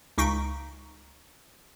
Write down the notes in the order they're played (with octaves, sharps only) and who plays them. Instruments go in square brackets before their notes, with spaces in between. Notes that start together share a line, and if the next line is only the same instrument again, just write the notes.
[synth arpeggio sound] C#2 D#4 C#6 B6 D7